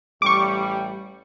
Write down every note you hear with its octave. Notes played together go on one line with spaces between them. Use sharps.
A1 G3 C#6 D6